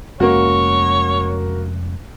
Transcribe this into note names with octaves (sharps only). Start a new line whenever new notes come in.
F1 G#3 A#3 C#4 F#4 C#5